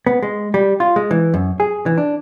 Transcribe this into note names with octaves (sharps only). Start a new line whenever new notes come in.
B3
G#3
G3
F4
G#3
E3
F#2
G#4
E3
D4